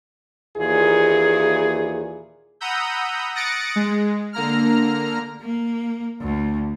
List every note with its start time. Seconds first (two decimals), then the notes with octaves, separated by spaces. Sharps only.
0.57 D#2 A#2 E3 G#4
2.61 F#5 A#5 B5 D#6 E6 G6
3.35 D#6 F#6 A6 A#6 C#7 D7
3.76 G#3
4.33 D3 A#3 A#5 F6
5.41 A#3
6.21 D2